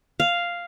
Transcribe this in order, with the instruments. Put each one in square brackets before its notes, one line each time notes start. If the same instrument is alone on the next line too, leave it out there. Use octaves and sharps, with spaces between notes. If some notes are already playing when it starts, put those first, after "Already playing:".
[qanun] F5